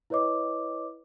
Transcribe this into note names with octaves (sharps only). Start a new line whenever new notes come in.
E4 B4 C#5 D#5 D6